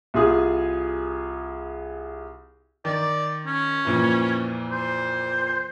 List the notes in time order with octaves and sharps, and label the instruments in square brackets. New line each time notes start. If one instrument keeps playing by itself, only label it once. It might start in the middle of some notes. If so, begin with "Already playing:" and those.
[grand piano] C2 F4 G#4 D#6
[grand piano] D#3 [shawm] D5
[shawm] C#4
[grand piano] F2 A#2 E3
[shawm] C5